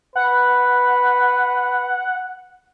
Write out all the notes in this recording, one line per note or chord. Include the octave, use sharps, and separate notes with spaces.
B4 F#5